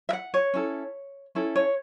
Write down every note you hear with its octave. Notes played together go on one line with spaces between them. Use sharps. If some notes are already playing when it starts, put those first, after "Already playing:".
E5
F#5
C#5
C#4 E4 A4
C#4 E4 A4
C#5